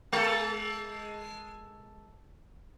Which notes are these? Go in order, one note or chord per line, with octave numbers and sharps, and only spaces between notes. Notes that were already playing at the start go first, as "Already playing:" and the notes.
G#3 A4